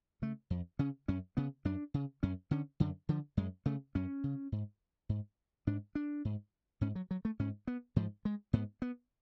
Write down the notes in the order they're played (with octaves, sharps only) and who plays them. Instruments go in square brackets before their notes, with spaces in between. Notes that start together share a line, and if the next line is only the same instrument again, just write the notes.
[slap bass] C#3 A3
F2
C#3 C#4
F#2 C#4
C#3 B3
F#2 D4
C#3
F#2 C#4
D3 C#4
F#2 D3
D3 F3
F#2 G#3
C#3 A3
F#2 C#4
C#3
G#2
G#2
G#2 D4
D4
G#2
G#2 C#4
F#3
F#3
A3
G#2 C#4
B3
G#2 F3
G#3
G#2 B3
B3